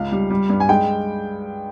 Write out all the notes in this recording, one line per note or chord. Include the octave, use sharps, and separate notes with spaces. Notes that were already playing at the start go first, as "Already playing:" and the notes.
Already playing: C#2 F5
G3
G3
G2
G#5
G#3 G5